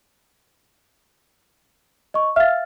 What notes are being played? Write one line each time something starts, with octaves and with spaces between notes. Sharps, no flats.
D#5 C#6
E5 F5 F6 A6